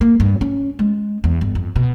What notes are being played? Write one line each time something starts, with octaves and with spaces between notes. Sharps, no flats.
A#3
G2
C#4
G#3
E2
G1
F2
B2